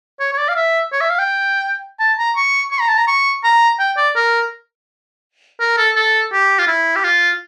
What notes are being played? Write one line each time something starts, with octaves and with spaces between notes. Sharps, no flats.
C#5
C#5
D5
F5
E5
C#5
E5
F5
G5
A5
A#5
C#6
C#6
A#5
A5
A#5
C#6
A#5
G5
D5
A#4
A#4
A4
A4
G4
F4
E4
G4
F4